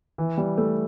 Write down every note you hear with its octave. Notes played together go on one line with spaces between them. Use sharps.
E3
G3
A3